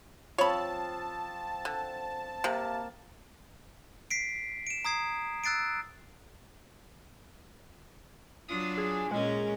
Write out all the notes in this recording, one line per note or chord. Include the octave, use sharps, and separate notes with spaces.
F3 C4 C#5 A5 B5 C#6
D3
C3 A#3
B6 C7 D7
D7 E7
A#5 D#6 G#6 C7
E6 F#6 A6 C7 D7
F#3 D4 F4 D#6
G#4
A#2 G#3 C#4 A#4